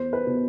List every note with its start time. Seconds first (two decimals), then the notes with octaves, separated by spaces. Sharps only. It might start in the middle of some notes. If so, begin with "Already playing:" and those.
Already playing: E2 C5
0.13 B4
0.27 B2